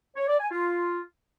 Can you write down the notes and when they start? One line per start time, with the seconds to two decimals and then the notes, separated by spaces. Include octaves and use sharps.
0.16 C#5
0.28 D5
0.40 G#5
0.51 F4